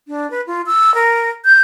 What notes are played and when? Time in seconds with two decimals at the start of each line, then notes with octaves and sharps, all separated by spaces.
0.08 D4
0.31 B4
0.47 F4
0.66 E6
0.94 A#4
1.45 G6